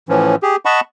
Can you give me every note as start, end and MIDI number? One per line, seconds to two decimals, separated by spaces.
0.09 0.36 45
0.09 0.36 52
0.09 0.36 53
0.09 0.36 61
0.42 0.56 67
0.42 0.56 68
0.65 0.81 75
0.65 0.81 78
0.65 0.81 81
0.65 0.81 83
0.65 0.81 85